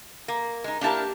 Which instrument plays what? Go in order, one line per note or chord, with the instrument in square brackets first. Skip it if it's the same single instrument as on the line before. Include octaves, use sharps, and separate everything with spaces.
[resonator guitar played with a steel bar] A#3
G#3 D#4
[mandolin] A#3 G4 A5 [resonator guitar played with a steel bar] D4 E4 A#4